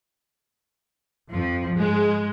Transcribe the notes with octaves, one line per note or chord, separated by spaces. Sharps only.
F2 F3
G#2 G#3